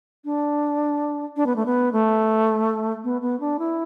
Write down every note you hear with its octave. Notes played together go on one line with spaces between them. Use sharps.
D4
D4
B3
A3
B3
A3
B3
B3
D4
E4